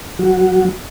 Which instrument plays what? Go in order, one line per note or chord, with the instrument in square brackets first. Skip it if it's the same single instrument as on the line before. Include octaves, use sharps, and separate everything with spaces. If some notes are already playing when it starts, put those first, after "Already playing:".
[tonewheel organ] F#3 F#4